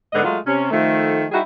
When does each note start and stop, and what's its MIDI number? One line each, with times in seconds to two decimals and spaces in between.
0.13 0.22 44
0.13 0.22 50
0.13 0.22 59
0.13 0.22 70
0.13 0.22 75
0.24 0.38 54
0.24 0.38 56
0.24 0.38 57
0.24 0.38 65
0.46 0.69 48
0.46 0.69 61
0.70 1.24 51
0.70 1.24 53
0.70 1.24 57
1.31 1.39 55
1.31 1.39 63
1.31 1.39 64
1.31 1.39 66
1.31 1.39 68